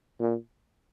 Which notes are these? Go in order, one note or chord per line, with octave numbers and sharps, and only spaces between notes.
A#2